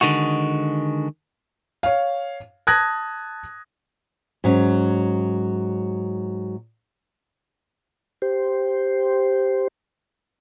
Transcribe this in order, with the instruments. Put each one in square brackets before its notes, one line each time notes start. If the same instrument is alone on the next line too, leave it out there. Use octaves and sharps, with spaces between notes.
[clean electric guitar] D3 D#3 G#3 F#4
[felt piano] C#5 F5
A5 D#6 F#6 G#6 A#6
[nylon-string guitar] G#2 F#3 C#4
[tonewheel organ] G4 C5